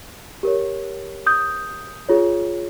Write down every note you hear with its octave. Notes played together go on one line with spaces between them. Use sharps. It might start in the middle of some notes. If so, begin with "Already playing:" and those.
G4 A#4 C#5
D#6 G6
F4 G#4 C#5